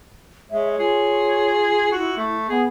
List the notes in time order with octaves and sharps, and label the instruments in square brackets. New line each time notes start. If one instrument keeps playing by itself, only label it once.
[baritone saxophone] G#3 [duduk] C#5 [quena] E5
[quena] F4 [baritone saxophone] G#4
[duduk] E4 [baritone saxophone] F#4
[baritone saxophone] A3
[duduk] B3 [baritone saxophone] G#4